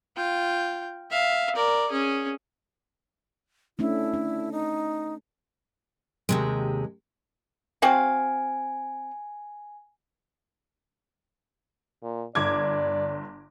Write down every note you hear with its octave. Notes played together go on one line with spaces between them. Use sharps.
F4 G5
E5 F5
A#4 D5
C#4 G#4
A3 C#4 D4 E4
D4
D#4
D#2 C3 G#3
C4 F#4 F5 G#5
A#2
G1 D5 D6 G#6